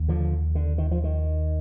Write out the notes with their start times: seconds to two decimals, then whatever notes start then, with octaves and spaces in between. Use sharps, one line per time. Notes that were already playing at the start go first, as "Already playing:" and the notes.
Already playing: D#2
0.08 D3 F3
0.55 D3
0.78 D#3
0.91 F3
1.04 D#3